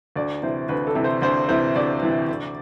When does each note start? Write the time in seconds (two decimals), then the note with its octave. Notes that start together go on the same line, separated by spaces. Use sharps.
0.16 D2 D5
0.42 C3 E3 C5
0.69 D2 B4
0.87 A4
0.95 C3 E3
1.04 C5
1.22 D2 C5
1.49 C3 E3 C5
1.75 D2 D5
2.02 C3 E3
2.29 D2